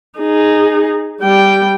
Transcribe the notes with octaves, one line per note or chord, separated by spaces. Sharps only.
D#4 G#4
G3 G5